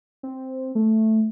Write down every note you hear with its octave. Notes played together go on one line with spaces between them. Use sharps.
C4
A3